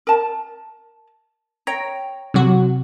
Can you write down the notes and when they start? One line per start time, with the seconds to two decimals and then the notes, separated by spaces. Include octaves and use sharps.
0.07 A#4 A5
1.67 C#5 G5 A#5
2.34 C3 F#3 F#4